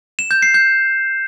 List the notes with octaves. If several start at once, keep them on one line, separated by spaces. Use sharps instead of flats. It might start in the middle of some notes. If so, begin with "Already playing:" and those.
E7
G6
C7
G6